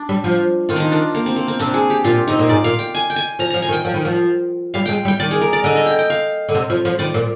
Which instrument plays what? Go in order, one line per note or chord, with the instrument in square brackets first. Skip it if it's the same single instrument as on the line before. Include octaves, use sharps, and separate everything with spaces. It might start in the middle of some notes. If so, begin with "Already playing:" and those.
Already playing: [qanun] D4
[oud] G3
F3
[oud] D#3 [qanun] F4
[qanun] D4 D#4
D4
A#3
C4
A#3
C4
[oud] C3 [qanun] D4
[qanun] G#4
G4
[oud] A#2 [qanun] F4
[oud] C3 [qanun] D#4
[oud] A#2
[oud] G#2 [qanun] D5
[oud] A#2 [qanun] F5
[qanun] G5
G#5
G5
G#5
[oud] F3 [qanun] A#5
[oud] F3 [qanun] A#5
[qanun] G#5
[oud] D#3
[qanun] G5
[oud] F3
D#3
F3
[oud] G3 [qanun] F5
[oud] G#3 [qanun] G5
[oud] G3
[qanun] G5
[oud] D#3 [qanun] D5
[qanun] G#4
A#4
D5
[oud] D3 [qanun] D#5
[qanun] D#5
G5
G5
F5
[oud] D3
C3
F3
F3
[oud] D#3 [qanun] D5
[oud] A#2